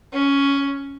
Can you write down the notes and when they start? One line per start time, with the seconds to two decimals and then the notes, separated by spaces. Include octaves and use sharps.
0.12 C#4